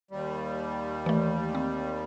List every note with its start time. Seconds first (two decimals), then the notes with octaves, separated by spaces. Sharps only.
0.11 D#2 G3
1.06 E3 A3
1.55 C4